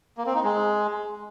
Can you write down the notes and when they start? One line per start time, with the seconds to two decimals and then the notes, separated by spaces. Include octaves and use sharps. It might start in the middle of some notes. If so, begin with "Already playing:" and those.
0.18 A#3
0.26 C4
0.35 D#4
0.44 G#3